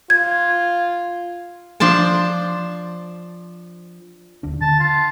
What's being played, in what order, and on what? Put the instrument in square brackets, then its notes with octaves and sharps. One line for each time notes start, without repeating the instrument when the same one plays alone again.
[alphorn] F4 [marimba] G#6
[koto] F3 D4 C5 A5
[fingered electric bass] D#1 D2 D4
[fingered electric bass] D3 [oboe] A5
[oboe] F4